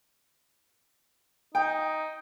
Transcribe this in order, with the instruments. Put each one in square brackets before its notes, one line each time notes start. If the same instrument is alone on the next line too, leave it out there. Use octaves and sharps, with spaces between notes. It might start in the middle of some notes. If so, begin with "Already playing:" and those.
[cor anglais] D#4 [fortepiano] G5